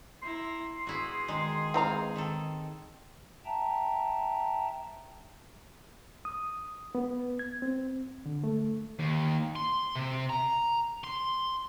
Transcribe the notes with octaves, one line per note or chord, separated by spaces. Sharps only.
E4 A#5 C6
B3 E4 F#4 G#4
D#3 G#3
E3 G#3 C4 F5 A#5
D#3 A4
E5 G5 A5 A#5
D#6
B3
G#6
C4
D3
A3
D#2
C6
C3
A#5
C6